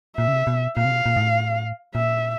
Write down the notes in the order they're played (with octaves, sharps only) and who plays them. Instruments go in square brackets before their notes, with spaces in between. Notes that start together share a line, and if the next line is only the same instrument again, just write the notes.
[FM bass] A#2 [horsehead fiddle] E5
[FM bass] C#3
C3
B2
[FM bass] A#2 [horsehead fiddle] F5
[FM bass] C3
B2
A#2
G#2
A2
[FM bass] A#2 [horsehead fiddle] E5